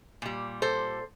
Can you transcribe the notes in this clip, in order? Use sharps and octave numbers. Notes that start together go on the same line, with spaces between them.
A#2 G3
A4 C5